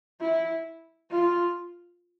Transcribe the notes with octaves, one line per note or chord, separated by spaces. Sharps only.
E4
F4